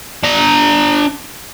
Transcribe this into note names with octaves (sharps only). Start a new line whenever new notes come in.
D4 A#5